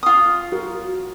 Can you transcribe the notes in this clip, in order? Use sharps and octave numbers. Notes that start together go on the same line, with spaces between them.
F4 D#6
F#4 A#4